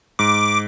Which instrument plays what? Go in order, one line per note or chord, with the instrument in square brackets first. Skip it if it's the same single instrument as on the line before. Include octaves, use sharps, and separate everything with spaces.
[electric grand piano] G#2 [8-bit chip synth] D6